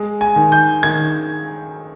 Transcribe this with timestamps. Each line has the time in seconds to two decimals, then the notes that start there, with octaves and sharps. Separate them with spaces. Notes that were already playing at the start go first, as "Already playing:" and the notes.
Already playing: G#3
0.21 G#5
0.36 D#3
0.52 G6
0.83 D#3 G#6